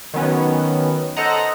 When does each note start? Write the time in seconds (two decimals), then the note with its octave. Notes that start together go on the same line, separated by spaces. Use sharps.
0.14 D#3 F#3 B3 C#4
1.17 A4 C5 D#5 F#5 A#5